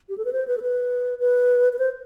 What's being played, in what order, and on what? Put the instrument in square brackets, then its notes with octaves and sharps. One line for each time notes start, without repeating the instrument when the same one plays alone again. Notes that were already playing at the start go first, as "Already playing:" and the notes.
[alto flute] G4
A4
B4
C5
B4
A4
B4
B4
B4
C5